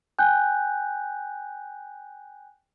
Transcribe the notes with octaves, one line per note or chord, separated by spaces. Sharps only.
G5 G#5 F#6 G6